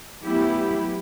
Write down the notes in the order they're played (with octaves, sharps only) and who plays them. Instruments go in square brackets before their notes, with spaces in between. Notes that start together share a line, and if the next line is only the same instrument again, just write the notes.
[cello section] F#3 A3 B3 E4 G4